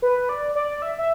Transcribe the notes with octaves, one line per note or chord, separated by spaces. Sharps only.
B4
D5
D5
E5
E5